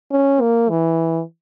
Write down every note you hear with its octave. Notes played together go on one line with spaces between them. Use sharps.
C#4
A#3
E3